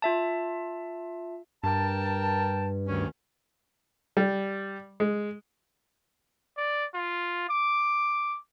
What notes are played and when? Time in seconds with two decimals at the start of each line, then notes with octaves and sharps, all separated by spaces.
0.02 F4 E5 A5
1.64 G2 A#4 G5 A5
2.86 D2 D#3 C#4
4.17 G3
5.00 G#3
6.57 D5
6.94 F4
7.49 D6